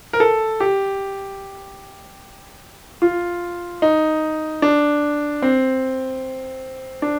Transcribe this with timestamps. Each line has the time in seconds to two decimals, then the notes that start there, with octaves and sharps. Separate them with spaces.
0.13 A#4
0.20 A4
0.60 G4
3.02 F4
3.82 D#4
4.62 D4
5.42 C4
7.02 D4